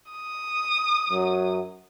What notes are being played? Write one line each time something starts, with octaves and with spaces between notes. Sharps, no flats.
D#6
F#2 F#3